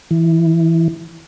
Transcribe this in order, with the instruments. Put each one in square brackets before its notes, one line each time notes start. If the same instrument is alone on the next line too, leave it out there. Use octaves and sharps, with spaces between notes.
[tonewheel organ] E3